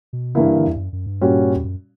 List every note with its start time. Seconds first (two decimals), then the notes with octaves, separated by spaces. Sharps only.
0.13 B2
0.35 G2 C#3 E3 A#3 E4
0.56 D3
0.67 E2
0.77 F#2
0.93 F#2
1.06 G2
1.21 A#2 G3 C#4 F#4
1.55 E2
1.64 F#2